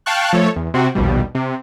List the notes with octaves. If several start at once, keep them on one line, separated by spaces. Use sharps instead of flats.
F5 G5 A5 C#6 F#6
F3 A3 A4 C#5
E2
C3 C4 F#4
A#1 D#2 B2 G3
C3